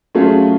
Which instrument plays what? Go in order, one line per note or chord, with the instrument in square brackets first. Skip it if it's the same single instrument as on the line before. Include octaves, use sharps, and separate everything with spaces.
[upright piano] F#3 A3 C#4 F4 G#4